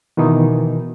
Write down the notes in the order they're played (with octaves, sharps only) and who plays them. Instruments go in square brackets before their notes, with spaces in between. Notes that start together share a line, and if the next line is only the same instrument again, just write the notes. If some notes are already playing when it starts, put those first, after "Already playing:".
[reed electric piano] B2 D#3 E3 D#4